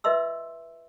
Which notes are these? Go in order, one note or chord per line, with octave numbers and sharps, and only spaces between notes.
F4 B4 D#5 E5 C6 E6